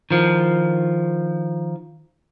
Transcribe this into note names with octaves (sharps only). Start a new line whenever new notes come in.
D#3 F3